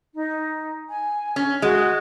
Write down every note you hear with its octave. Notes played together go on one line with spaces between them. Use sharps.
D#4
G#5
C#4
G#3 F#4